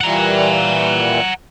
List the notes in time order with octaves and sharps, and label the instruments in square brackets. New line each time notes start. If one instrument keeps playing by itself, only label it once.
[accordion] A#2 E3 G3 [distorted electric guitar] F#5 A#5